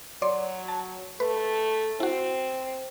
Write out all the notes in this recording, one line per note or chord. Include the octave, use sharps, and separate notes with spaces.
F#3 C#5 D5 C6
A5
A3 B4
C4 E4 F#4